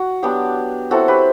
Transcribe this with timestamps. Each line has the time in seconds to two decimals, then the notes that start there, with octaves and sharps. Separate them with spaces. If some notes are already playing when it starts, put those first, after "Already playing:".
Already playing: F#4
0.22 F#3 B3 D4 G4
0.91 F#3 C4 E4 F#4 A4
1.08 G4 B4